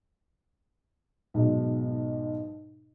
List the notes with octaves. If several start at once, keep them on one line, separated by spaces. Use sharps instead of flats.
B1 G#2 B2